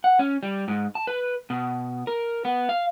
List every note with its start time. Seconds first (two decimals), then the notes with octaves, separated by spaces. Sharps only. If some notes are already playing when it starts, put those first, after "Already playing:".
0.04 F#5
0.19 C#4
0.43 G3
0.68 G#2
0.95 A5
1.07 B4
1.50 B2
2.07 A#4
2.45 B3
2.69 F5